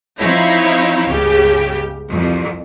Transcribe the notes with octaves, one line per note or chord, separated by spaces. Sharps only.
F3 C4 D#4 E4 C#5 F5
G1 C#2 C#3 G4
C2 F2